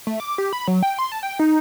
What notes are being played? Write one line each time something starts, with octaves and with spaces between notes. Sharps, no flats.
A3
D6
G4
B5
F#3
G5
C6
A5
G5
D#4